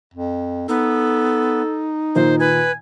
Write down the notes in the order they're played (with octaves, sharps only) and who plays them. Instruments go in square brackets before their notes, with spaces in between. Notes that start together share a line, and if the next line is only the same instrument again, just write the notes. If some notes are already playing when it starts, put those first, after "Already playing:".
[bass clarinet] F2
[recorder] B3 [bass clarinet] D#4 [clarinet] A4
[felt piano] A#2 D#3 [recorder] C5
[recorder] B4 [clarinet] G#5